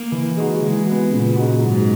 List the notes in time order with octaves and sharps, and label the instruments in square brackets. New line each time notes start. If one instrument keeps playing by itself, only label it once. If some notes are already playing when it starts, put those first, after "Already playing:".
Already playing: [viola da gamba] A#3
[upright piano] E3
G#3 D#4 F#4
[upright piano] E3 [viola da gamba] G#3
[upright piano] B3 F#4
[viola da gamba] A#2 [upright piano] C#3
[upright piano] G#3 D#4 F#4
[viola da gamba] G#2 [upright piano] F#3